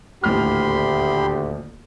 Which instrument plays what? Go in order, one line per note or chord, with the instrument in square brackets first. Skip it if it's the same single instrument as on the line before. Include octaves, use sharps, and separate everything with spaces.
[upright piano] D#1 A1 F6 [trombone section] D2 [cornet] G4 [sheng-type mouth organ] B5 C6